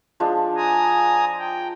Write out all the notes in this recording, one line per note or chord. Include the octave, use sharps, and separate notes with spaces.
F3 G#3 D4
G#5 A#5 D#6
G5